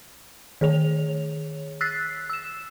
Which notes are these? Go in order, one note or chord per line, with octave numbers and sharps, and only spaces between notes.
D#3 G#4 C#5 F7
E6 F#6 A6 B6 C7
E6 E7